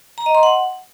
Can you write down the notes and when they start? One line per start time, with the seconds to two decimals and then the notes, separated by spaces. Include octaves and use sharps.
0.18 A#5
0.26 D#5
0.35 C6
0.43 F#5